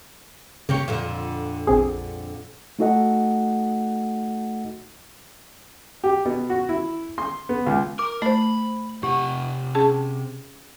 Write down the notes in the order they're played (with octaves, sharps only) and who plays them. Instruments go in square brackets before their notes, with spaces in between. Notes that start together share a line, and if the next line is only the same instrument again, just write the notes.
[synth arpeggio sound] C#3 [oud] A#3 G4 C#5
[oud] F2 A#2 D3
[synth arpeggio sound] A#1 C4 G#4
[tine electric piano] A3 D#4 F#4 A4 D#5 F#5
[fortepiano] G4
B2
F#4
E4
C6
B3
C#2
[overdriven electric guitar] A#4 [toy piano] D6
[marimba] A3 [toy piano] C5 D#5 [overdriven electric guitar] B5
[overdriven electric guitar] C3 F#5 [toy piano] G4
[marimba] C#4 G#4 A5